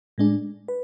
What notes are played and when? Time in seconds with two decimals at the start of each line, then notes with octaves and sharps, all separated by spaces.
0.18 A2 G#3 D4
0.68 B4